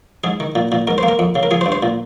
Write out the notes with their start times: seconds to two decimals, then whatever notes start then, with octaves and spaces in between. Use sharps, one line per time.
0.24 G#2 G#4
0.40 D#3
0.55 A#2
0.72 A#2
0.87 G#2 A#4
0.98 C5
1.03 A#3
1.08 A#4
1.19 F2
1.35 C#3
1.43 A#4
1.51 F3 G#4
1.61 C5
1.66 G2
1.72 C5
1.83 A#2